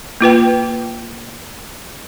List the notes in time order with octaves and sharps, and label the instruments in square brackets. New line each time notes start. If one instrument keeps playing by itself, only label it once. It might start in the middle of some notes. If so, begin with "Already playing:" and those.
[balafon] A#3 F4 B4 G5